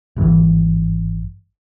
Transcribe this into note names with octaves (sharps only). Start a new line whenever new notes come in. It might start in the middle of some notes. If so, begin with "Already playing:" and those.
G#1 G2 B2 E3